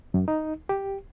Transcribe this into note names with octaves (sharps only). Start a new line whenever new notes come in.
F#2
D#4
G4